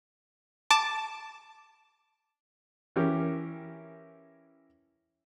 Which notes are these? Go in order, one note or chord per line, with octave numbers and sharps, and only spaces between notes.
A5 D6
E3 C#4 G4 A#4